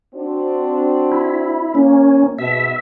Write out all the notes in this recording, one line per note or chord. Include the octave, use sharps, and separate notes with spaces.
C4 D4 F#4
E4
A#3 C#4
G#2 B2 E5